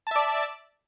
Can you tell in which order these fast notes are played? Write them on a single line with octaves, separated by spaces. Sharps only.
A5 E5 D5